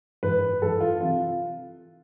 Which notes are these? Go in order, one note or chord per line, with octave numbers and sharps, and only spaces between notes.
G#2 E3 B4
G#2 E3 A4
F4
C3 E3 F4